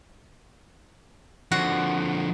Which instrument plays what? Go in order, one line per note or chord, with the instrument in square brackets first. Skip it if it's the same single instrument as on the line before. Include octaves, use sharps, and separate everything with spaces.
[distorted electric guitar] D3 F3 [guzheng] F#4